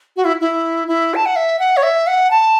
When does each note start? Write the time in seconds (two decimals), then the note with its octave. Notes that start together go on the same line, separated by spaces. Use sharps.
0.17 F#4
0.25 E4
0.41 E4
0.88 E4
1.15 A5
1.26 F#5
1.36 E5
1.59 F#5
1.77 C#5
1.83 E5
2.07 F#5
2.31 A5